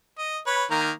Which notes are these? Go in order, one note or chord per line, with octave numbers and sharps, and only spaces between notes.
D#5
B4 C#5
D#3 A#3 A#5